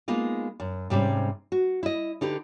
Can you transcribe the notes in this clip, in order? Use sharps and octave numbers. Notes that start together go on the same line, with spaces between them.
G#3 A#3 B3 D#4 F4
F#2
G#2 C3 G3 C#4
F#4
E4 D#5
D3 D#4 G4 B4